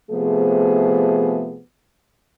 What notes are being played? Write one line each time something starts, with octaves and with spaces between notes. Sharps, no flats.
C3 F3 A3 B3 G#4